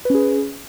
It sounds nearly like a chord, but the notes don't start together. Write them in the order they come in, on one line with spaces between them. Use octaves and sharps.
B4 C#4 G#4